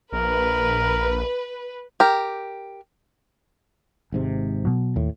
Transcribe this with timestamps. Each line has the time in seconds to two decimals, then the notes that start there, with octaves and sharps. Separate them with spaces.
0.12 A#1 A#4 B4
2.00 G4 A#4
4.12 G#1 G#2 C3
4.65 B2 F#3
4.96 D#2 A2